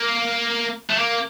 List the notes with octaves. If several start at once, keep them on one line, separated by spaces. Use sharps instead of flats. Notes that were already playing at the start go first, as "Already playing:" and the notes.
Already playing: A#3
A3
A#3